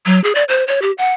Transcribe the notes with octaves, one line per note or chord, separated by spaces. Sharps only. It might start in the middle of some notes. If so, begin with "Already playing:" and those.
F#3
G#4
D5
C5
C#5
G4
F#5